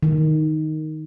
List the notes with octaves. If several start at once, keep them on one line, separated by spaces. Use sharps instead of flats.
D#3